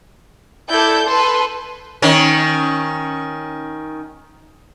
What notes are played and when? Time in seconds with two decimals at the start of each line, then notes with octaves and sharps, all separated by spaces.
0.69 E4 A4 D5 G6
1.07 A4 B4 C6
2.02 D#3 C#4